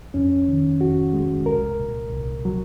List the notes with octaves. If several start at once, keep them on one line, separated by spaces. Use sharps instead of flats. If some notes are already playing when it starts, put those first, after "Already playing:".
F2 C#4
D#3
F2 F#4
G#3
C2 A#4
A#2
C2
F#3